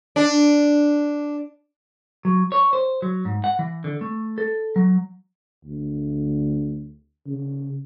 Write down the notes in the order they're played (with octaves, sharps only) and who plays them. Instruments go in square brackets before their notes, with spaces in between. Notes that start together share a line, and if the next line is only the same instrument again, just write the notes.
[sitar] D4
[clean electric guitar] F#3
C#5
C5
F#3
G#2
F#5
E3
D3
A3
A4
F#3
[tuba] D2
C#3